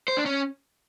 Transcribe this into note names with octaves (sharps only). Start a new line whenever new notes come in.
C5
D4
C#4